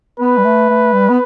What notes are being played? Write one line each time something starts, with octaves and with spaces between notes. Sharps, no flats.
B3 B4
G3
A3
A3
G3
B3